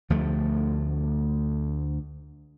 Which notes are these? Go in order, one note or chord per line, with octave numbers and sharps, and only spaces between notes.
D2 F3 A3